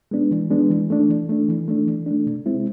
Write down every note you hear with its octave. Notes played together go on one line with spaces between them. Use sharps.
G#3 B3 D4
E3
G#3 B3 D4
E3
A3 D4
E3
A3 D4
E3
A3 D4
E3
A3 D4
C3
G#3 C4 E4